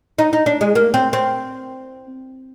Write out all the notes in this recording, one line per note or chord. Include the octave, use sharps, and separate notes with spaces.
D#4
D#4
D4
G#3
A#3
C4
C4